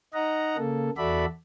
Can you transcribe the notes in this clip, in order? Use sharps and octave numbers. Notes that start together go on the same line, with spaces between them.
D#4 D#5 F#5 A#5
C#3 A#3 A4
E2 F#4 A4 D5 E5 B5